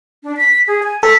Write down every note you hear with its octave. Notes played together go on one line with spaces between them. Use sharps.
D4
B6
G#4
G#5
A4 B6